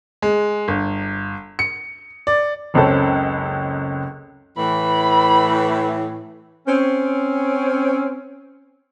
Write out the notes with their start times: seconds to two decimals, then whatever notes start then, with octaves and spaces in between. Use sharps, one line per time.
0.22 G#3
0.68 G1
1.59 C#7
2.27 D5
2.74 F#1 C#2 C4 C#4 A4
4.58 A2 E3 B5
6.67 C4 C#4